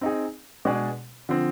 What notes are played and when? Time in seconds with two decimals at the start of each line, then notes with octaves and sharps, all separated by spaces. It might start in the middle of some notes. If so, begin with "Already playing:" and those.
0.01 C4 D#4 G#4
0.65 B2 G#3 D4 G#4 D5
1.29 D3 F3 C4